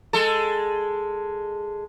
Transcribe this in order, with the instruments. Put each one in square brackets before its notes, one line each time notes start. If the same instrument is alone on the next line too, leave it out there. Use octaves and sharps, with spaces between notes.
[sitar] G#3 A4